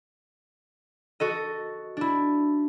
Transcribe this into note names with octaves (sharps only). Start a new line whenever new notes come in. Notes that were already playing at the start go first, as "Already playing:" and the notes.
F#4 A4 D#5
D4 E4